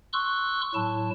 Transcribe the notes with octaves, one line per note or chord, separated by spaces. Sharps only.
C6 C#6 E6 F#6
A2 F#3 E4 A5